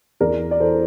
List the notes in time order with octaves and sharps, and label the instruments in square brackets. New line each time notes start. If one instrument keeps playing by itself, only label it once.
[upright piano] E2 A#4 D5
D5
E3 A4 C5